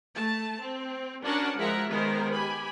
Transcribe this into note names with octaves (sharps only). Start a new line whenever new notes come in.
A3 A5
C4
C#4 D4 F#4 A#4 F#5 A5
F3 G#3 A#4 E5 F#5 A#5
D#3 G#3 B3 A#4 C5
G4 G#5 B5